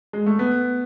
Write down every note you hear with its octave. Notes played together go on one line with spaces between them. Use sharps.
G#3
A3
B3